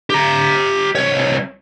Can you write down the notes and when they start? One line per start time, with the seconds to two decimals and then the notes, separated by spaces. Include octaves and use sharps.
0.10 G4 A#5
0.95 C2 C#5